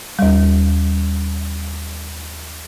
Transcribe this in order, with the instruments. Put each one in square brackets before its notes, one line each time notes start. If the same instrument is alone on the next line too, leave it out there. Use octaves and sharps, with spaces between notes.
[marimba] D#2 G3